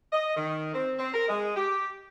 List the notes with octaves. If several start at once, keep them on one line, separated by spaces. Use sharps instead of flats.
D#5
D#3
C4
C4
A#4
G#3
G4